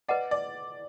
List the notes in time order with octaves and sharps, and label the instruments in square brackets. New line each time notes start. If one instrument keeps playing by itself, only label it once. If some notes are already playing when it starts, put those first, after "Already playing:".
[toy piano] B4 D#5 F#5 A#5 [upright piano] D5
[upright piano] D5